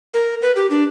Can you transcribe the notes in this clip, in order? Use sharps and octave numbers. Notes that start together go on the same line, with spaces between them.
A#4
B4
G4
D4